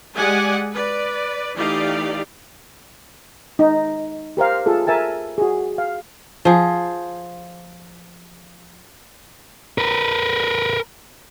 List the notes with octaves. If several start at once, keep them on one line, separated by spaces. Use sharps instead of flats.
G#3 G4 G#4 D5 F#5 G#5
B4 D5
E3 A3 D#4 G4 D5 F5
D#4
G4 A#4 C5 F5
F4 G#4 A4
A#4 E5 G#5 A5
F#4 G#4
F5
F3 G#4
A#4 B4